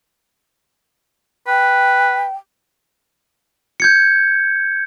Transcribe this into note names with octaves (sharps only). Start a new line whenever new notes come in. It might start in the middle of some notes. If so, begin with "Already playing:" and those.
B4 G5
G6 G#6 C#7